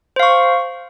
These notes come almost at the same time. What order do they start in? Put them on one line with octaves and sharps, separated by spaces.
C5 F5 C#6